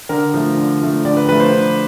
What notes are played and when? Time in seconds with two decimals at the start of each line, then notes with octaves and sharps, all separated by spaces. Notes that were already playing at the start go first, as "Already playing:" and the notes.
0.09 D3 A#4
0.34 F3 A3
0.57 D3
0.82 F3 A3
1.05 D3 D5
1.17 B4
1.29 F3 A3 B4
1.40 C5
1.53 D3